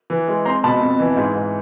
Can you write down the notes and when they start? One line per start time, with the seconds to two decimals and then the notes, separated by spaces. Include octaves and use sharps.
0.10 E3
0.28 G#3
0.45 C4 A#5 C6
0.64 B2 A5 B5
0.81 F2
0.99 E3
1.17 G#2
1.35 G#2